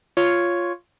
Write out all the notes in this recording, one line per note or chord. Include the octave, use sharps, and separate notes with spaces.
F4 C#5